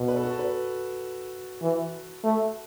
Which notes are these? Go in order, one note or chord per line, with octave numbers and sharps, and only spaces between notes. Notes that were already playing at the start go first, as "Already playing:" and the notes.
Already playing: B2
B4
A4
F#4
A4
B4
E3
A3